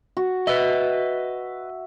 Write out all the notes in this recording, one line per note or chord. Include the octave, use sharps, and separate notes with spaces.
F#4
B4 D#5 E5